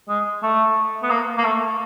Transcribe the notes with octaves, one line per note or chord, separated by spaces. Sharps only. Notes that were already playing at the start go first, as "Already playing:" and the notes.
G#3
A3
B3
A#3
A#3
A3